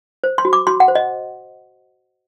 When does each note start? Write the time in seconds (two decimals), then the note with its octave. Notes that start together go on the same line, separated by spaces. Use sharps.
0.24 C5
0.38 C6
0.45 F#4
0.53 D6
0.67 F#4 C6
0.80 F#5
0.88 C5
0.95 D#5